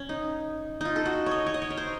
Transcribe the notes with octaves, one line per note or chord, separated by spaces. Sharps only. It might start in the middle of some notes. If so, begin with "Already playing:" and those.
Already playing: C#4
D#4
D#4 F4
A4
F#4
C#5 D#5
C#5
D#5
C#5
A#4
C5